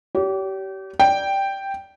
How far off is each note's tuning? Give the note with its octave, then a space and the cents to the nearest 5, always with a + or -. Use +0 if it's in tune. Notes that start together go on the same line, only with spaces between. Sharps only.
G4 -30 C#5 +40
D5 +0 G5 +0